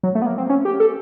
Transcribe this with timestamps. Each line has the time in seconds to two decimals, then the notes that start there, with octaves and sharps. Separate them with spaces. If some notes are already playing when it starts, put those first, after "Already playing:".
0.03 F#3
0.15 A3
0.22 B3
0.26 A#3
0.38 C4
0.49 C#4
0.65 G4
0.80 A4